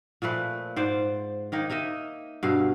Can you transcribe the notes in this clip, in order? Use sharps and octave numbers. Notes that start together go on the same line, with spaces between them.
A#2 F3 A3 B4
G#2 C5 D5
D#3 A#3 D#4
A#3 D#4 D#5 E5
G2 B2 F5